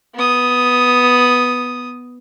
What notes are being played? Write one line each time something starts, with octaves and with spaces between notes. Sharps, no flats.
B3 D#6